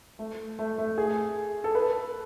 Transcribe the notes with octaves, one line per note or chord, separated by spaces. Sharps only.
A3
A3
A3
G#4
A4
B4